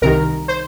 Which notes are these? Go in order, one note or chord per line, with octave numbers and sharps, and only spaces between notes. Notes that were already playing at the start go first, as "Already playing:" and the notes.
C2 C3 D#3 A#4
C5